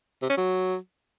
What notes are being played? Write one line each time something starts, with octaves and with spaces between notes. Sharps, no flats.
C3
C#4
F#3